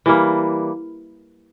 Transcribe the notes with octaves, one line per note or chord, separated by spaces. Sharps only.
E3 G3 A#3